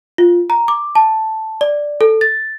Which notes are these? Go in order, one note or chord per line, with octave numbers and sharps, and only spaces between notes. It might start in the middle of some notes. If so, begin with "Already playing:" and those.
F4
A#5
D6
A5
D5
A4
A6